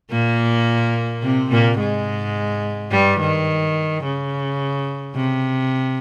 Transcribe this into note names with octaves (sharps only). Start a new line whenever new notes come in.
A#2 A#3
C3 C4
A#2 A#3
G#2 G#3
G2 G3
D#3
C#3
C3